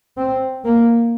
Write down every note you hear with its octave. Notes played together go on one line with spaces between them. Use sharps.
C4
A#3